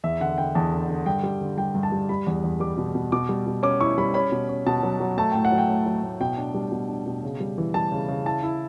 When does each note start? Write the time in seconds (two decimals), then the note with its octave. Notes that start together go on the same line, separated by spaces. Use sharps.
0.04 E2 E5
0.21 D3 F#5
0.38 D3 G5
0.55 E2 A5
0.72 D3
0.89 D3
1.06 G2 G5
1.23 G3
1.41 D3
1.57 G3 G5
1.75 G2
1.83 A5
1.92 G3
2.09 G3 B5
2.27 E2
2.44 E2
2.60 G3 D6
2.78 B2
2.95 B2
3.12 B2 D6
3.29 G3
3.47 B2
3.63 C#4 D6
3.81 E4 C#6
3.98 G3 B5
4.14 C#4 B5
4.32 B2
4.49 C#4
4.66 B2 A5
4.83 F#3
5.00 F#3
5.18 A3 A5
5.32 A2 G5
5.45 F#5
5.52 F#3
5.58 G5
5.69 A2
5.86 F#3
6.03 A2
6.20 B2 G5
6.37 D4
6.54 G3
6.72 B2
6.88 D4
7.07 B2
7.23 C#3
7.40 G3
7.58 E3
7.74 G3 A5
7.92 C#3
8.09 C#3
8.25 E4 A5
8.43 E4